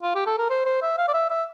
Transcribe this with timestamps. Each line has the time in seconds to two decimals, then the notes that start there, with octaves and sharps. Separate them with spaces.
0.03 F4
0.15 G4
0.26 A4
0.38 A#4
0.50 C5
0.66 C5
0.82 E5
0.98 F5
1.08 D5
1.14 E5
1.30 E5